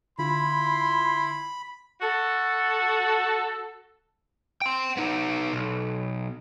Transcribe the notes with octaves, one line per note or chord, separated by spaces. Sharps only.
D3 E4 F4 B5 C6
F#4 A4
G5 C6
B3 D#4
B1